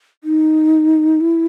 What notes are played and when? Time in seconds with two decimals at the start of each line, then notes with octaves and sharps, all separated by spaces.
0.24 D#4
1.21 E4